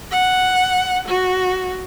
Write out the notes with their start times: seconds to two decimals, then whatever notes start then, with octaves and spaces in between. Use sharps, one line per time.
0.12 F#5
1.08 F#4